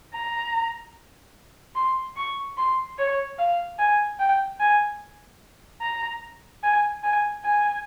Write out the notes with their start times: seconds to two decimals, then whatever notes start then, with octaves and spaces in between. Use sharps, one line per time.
0.14 A#5
1.75 C6
2.16 C#6
2.57 C6
2.98 C#5
3.39 F5
3.79 G#5
4.19 G5
4.60 G#5
5.81 A#5
6.63 G#5
7.03 G#5
7.44 G#5